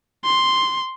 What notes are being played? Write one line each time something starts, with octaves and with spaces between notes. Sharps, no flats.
C6